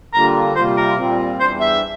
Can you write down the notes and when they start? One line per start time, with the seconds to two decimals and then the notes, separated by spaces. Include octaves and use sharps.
0.13 D3 G3 A#3 D4 F4 A#5
0.55 C3 G3 A#3 F4 C5
0.77 A#4
0.97 A#2 G3 C4 F4
1.40 E2 E3 G3 D4 C5
1.60 E5